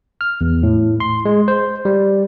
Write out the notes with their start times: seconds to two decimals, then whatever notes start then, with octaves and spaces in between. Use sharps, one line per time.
0.21 F6
0.41 E2
0.63 A2
1.00 C6
1.25 G#3
1.48 C5
1.85 G3